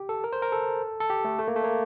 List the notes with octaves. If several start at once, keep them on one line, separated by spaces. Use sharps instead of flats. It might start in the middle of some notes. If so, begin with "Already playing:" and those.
Already playing: G4
A4
A#4
C5
A#4
A4
A4
G4
A3
A3
A#3
A3
A#3